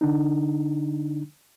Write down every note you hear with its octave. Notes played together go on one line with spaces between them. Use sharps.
D3 D4 D#4